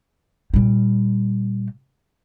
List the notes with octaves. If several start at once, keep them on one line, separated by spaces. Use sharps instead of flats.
A#2 G3